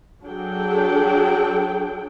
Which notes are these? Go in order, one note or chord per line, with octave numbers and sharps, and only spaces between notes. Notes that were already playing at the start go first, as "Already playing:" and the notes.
F#3 D4 G#4 A4 G5